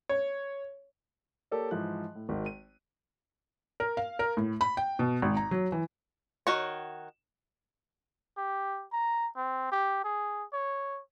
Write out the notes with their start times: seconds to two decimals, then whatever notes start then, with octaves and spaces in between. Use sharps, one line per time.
0.09 C#5
1.51 A#3 G4 A4 A#4 C#5 D5
1.71 G#2 E3 F3 F#6
2.15 A2
2.29 G#1 D#3 F#4
2.46 D#7
3.80 A#4
3.97 F5
4.19 A#4
4.37 A2
4.61 B5
4.77 G5
4.99 B2
5.22 G#1
5.37 A#5
5.51 F#3
5.72 E3
6.47 D#3 F#4 C#5
8.37 G4
8.92 A#5
9.36 C4
9.71 G4
10.04 G#4
10.53 C#5